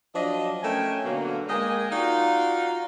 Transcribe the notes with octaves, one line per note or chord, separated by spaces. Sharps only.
F3 F#3 D4 D#5
A3 C#4 A#4 E5 G5 G#5
B2 D3 F#3 A#3
G#3 A#3 D#5 G5 G#5
D#4 F4 F#4 D5 F5 F#5